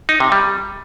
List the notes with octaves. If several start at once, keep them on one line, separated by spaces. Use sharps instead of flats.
D#4
C3
G3